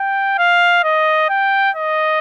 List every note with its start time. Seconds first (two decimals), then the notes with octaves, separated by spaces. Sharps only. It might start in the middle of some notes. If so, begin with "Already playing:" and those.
Already playing: G5
0.38 F5
0.84 D#5
1.29 G5
1.76 D#5